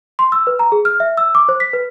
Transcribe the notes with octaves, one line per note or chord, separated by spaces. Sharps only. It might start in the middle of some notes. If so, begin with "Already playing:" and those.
C6
E6
B4
A#5
G#4
F6
E5
E6
D6
C5
B6
B4